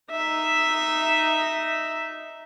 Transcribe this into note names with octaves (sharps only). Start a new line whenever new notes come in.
D#4 E5